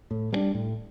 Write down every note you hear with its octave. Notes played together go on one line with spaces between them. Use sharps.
A2
G3 A#3 D4
A2